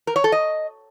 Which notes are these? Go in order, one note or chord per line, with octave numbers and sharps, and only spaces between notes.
A#4
C#5
A4
D#5